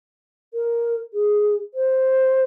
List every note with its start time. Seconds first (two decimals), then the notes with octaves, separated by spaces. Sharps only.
0.54 A#4
1.13 G#4
1.74 C5